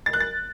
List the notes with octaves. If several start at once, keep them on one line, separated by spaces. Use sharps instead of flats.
A6
F#6
A6